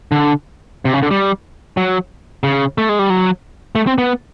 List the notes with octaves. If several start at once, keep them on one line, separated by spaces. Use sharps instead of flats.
D3
C3
C#3
D3
G3
F#3
C#3
A3
G#3
G3
F#3
A3
C4
B3